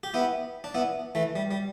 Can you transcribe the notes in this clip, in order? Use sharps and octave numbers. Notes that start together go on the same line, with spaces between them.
G4
B3 E4
D4
B3 E4
E3 A3
G3
G3